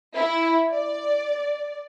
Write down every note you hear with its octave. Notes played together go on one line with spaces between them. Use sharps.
E4
D5